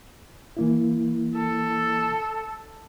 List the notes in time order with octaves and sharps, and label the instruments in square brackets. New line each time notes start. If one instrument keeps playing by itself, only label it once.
[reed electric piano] E3 A#3 E4
[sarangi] A4